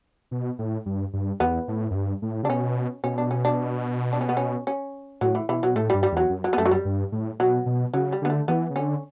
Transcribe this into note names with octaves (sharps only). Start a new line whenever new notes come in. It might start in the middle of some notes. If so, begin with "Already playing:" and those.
B2
A2
G2
G2
E2 B3
A2
F#2
G2
A2
C#3 D4
B2 C#4
B2 C#4
D4
C#4
D4
D4
C#4
B3
C#4
C#4
A2 F#3
E3
B2 E3
B2 F#3
A2 A3
G3
G2
G3
E2 F#3
F#2
F#3
B3
F#2 A3
F#3
G3
G2
A2
B2 F#3
B2
C#3 F#3
G3
D3 B3
A3
E3 B3
C#3
D3 C#4